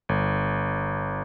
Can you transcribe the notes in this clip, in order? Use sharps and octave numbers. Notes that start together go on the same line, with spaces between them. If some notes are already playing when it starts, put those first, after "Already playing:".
G1